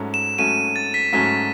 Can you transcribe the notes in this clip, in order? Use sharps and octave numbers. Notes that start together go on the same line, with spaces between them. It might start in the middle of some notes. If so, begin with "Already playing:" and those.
Already playing: G#2 F#3 A3 C#4
E7
G#2 F#3 A3 C#4 D#7
A6
B6
G#2 F#3 A3 C#4 B6